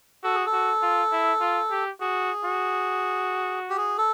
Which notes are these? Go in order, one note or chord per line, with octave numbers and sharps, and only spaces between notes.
F#4 A4
G#4
A4
F#4
F4
E4
F4
G4
F#4 G#4
F#4
G4
G#4
A4